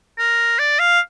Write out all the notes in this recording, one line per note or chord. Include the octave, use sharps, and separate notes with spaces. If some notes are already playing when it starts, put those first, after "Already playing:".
A#4
D5
F5